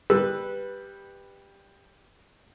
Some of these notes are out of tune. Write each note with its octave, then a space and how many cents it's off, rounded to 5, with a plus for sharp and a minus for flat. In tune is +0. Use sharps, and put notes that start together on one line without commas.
G3 +15 B4 -5 E6 +0